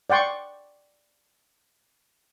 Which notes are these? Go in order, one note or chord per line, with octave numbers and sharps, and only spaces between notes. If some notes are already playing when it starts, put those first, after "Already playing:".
D5 F#5 G5 C6 C#6